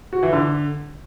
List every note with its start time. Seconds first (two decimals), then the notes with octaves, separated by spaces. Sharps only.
0.13 F#4
0.23 E3
0.33 D3